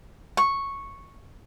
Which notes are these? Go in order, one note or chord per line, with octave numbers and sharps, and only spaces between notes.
C#6